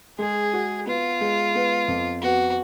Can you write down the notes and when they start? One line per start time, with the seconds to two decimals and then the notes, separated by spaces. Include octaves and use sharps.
0.19 G#3 G#4
0.53 F#4
0.87 B3 F4
1.21 G#3
1.55 B3
1.88 F2
2.22 B3 F#4